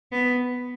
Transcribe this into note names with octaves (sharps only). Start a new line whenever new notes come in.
B3